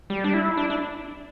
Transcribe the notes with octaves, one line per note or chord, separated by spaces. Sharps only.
G3
D4
E4
D4
D4